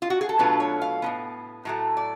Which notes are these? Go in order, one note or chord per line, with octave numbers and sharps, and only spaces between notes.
F4
F#4
G#4
A4
B2 F#3 A3 D4 F4 B4
C#5
F5
A2 F3 B3
A2 F#3 A3
D5